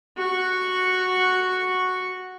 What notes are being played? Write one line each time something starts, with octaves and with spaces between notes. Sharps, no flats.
F#4 C#6